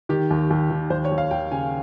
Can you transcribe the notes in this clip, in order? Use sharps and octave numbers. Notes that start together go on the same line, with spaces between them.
D#3 G4
D#2
D#2
D#3
D#2 C5
C#5
D#2
F5
D#2 G5
C#3 G#5